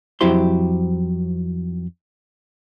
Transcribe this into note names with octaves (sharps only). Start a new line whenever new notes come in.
F2 F#3 E4 G4 C5 C6